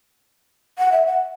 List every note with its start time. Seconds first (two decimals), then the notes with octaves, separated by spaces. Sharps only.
0.79 F#5
0.92 E5
1.06 F#5